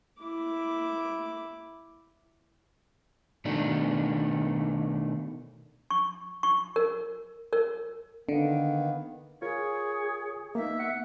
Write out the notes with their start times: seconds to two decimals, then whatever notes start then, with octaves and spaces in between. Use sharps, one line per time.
0.22 E4 D6
3.45 B2 D#3 A3 D4
5.90 C#6
6.43 C#6
6.76 A#4
7.53 A#4
8.29 D3 D#3 A#3 B3
9.42 F4 G#4 A#4 C#5
10.55 A#3 B3 D#4 E5
10.79 F#5